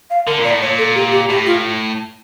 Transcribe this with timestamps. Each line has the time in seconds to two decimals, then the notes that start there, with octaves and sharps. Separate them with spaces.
0.10 F5
0.27 D3 A#4
0.38 A#2
0.44 D5
0.50 A2
0.62 A#2 C#5
0.78 A4
0.96 G4
1.12 G4
1.30 A2 G4
1.46 F4